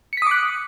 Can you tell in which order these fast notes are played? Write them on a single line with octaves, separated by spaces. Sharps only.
C#7 B6 D#6 D6 F#6